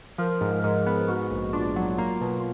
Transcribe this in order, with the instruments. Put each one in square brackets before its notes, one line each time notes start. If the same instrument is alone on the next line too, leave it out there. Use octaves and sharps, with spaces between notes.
[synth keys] F3 [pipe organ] A#4
[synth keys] G#2
[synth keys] G#2 [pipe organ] A#4
[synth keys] B3
[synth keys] G#2 [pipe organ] F#4
[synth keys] A#1
[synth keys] D4 [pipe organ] F4
[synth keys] F#3
A#3
B2